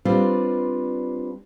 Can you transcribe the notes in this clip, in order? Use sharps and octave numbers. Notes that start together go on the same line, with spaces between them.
G3 C4 D4 F4 B4